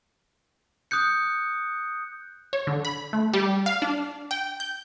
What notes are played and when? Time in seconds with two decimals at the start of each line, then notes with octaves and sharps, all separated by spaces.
0.91 D#6 F#6 G6 C#7
2.53 C#5
2.67 D3
2.85 B5
3.13 A3
3.33 G3
3.66 F5
3.82 D4
4.31 G5
4.60 G6